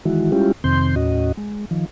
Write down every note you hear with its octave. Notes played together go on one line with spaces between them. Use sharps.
D#3 E3 G#3 E4 F#4
G3 G#3 C#4 E4 F4 G4
F2 C3 D#3 C4 C6 G6
D#2 A2 C#4 F#4 D#5
G#3
D#3 F3